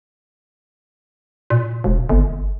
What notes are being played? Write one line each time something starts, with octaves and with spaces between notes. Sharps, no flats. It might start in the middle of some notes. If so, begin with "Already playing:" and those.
A#2
E1
G1